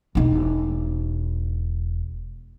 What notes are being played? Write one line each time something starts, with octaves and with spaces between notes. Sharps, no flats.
E1 D#4